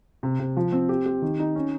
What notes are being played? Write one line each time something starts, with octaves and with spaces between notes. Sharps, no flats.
C3
C3
F3
C4
G4
G4
D#3
D#4
C#4